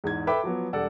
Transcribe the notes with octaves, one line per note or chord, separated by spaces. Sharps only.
E2 G#2 G#6
A4 B4 E5 G5 B5 D6
F3 F#3 B3
E1 G3 A4 D5 F#5 E6